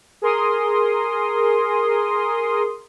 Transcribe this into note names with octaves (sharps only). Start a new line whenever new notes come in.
G#4 A#4 C6 D#6